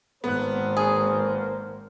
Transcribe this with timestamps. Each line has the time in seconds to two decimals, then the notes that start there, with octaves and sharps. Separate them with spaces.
0.24 G#1 A#3 B3 A#4 C5 F#6
0.77 G#4